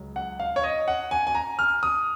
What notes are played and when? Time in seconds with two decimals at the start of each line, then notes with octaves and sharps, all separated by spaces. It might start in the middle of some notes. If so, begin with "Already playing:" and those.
Already playing: C#2 F#3
0.16 F#5
0.40 F5
0.56 C#5
0.64 D#5
0.88 F#5
1.11 G#5
1.27 G#5
1.35 A#5
1.59 F6
1.83 D#6